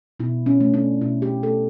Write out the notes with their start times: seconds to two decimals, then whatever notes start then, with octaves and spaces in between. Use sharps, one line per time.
0.20 B2 E4
0.46 C#4
0.60 A3
0.74 D4
1.01 B2 E4
1.22 G4
1.43 A3 A4